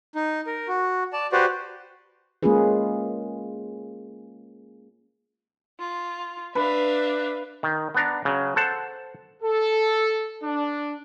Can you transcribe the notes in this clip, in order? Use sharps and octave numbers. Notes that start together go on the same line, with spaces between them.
D#4
A#4
F#4
D5 A5
F#4 G4 B4 C5 D5
G#3 A#3 C#4 F4 G#4 B4
F4
D4 B4 E5 F5
D#3
B3 D4 A#5
C#3 F#3
A4 C5 F#5 A5
A4
D4